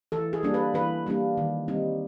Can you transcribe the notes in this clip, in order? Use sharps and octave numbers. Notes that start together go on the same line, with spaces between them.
E3 A4
G#4
G3 A#3 D4
B4
E3 B4
G3 A#3 D4
D#3
G3 C4 D#4